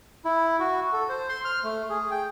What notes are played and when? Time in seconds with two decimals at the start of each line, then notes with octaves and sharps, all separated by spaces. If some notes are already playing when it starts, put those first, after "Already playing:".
0.25 E4
0.60 F#4
0.93 A4
1.09 C5
1.29 C6
1.45 F6
1.63 A3
1.90 G#4
2.11 G5